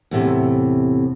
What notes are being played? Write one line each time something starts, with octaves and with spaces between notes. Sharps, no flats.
E2 A2 C3